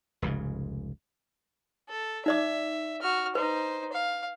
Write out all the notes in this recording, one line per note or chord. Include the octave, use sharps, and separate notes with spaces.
F1 C#2 G#2 C#3
A4
D#4 D5 E5 D6
F#4 F6
D#4 B4 C5
F5